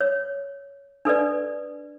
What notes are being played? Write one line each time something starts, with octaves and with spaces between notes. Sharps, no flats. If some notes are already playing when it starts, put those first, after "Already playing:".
C#5
D4 A4 B4 D5